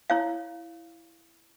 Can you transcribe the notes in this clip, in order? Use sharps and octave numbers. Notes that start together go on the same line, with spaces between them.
E4 C#5 F5